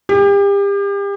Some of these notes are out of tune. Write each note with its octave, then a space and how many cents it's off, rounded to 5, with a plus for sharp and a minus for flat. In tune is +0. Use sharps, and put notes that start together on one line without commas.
G4 +35